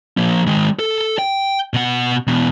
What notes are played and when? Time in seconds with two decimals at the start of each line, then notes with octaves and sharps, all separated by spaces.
0.17 F3 A#3
0.47 D#3 G#3
0.79 A4
1.19 G5
1.74 B2 F#5
2.27 E2 B2